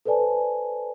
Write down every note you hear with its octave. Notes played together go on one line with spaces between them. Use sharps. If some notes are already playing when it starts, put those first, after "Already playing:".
A4 B4 C5 D5 G#5 A5